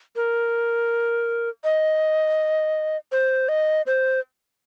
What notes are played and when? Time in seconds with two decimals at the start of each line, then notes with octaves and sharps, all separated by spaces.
0.16 A#4
1.64 D#5
3.12 C5
3.48 D#5
3.86 C5